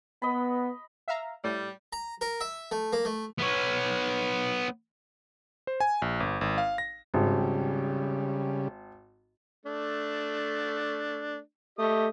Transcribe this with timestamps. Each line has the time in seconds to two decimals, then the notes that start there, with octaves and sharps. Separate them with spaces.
0.22 B3 D#5 B5
1.08 E5 F5 A#5
1.44 A2 G3
1.93 A#5
2.21 A#4
2.41 E5
2.71 A3
2.93 A#3
3.05 A3
3.38 B3 C#5
5.67 C5
5.80 G#5
6.02 A#1
6.20 G1
6.41 G#1
6.58 F5
6.78 A#6
7.14 G#1 C#3 G3
9.66 A3 D4
11.79 A3 G4 D#5 D#6